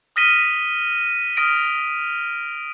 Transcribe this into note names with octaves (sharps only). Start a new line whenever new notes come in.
D#6 F6 A#6 B6 D#7 G7
D#6 F6 A#6 D7